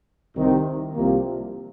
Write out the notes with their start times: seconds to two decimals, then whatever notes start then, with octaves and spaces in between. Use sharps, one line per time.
0.36 C2 C3 D#3
0.95 C2 C3 F3 A#3